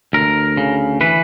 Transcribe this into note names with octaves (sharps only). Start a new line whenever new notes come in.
D2 A#4
C#3
E3 B4